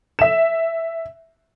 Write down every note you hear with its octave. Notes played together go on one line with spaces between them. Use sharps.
E5 E7